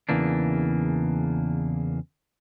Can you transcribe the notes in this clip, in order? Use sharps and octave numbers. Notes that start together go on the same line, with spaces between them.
E2 C#3 E3 A#3 D4